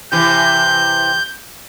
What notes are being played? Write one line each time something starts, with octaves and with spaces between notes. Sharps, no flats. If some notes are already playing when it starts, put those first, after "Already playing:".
C3 E3 G6